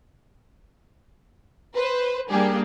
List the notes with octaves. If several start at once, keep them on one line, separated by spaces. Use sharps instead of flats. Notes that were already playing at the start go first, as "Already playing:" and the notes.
B4 C5
G3 A#3 D4 G4 G#4